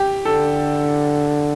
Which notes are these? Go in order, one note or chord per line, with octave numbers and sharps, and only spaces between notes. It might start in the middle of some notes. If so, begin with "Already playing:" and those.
Already playing: G4
D3 A4